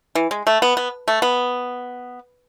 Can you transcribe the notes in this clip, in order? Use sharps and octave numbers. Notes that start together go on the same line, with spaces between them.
E3
G#3
A3
B3
B3
A3
B3